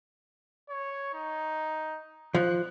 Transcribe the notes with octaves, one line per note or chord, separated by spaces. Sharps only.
C#5
D#4
F3 F#6